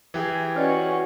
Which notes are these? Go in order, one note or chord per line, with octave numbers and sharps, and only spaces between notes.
E3 G4 G#4
C#4 F#4 B4 D5 D#5